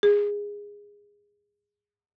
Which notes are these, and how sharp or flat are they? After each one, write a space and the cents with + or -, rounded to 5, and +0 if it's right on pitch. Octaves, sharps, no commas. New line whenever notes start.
G#4 -15